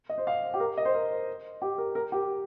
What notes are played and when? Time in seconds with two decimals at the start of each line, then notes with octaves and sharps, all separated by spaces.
0.09 D#5
0.18 C5
0.27 F5
0.54 G4
0.60 A#4
0.77 D#5
0.85 C5
0.94 A#4
1.62 G4
1.78 A#4
1.95 A#4
2.12 G4